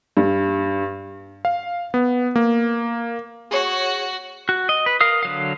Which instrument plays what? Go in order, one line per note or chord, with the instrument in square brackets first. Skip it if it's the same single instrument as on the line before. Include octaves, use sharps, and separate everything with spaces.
[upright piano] G2
[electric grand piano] F5
B3
A#3
[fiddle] F#4 [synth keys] G#4 C#5
[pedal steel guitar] F#4
D#5
B4
A#4 F5 D#6
D3 F#3 F5